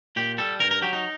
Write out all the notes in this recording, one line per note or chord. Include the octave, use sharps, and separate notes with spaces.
A#2 G4
G3 A4
G2 A#4
A#4
F#3 G4
D#4